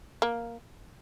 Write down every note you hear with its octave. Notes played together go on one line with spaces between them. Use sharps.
A#3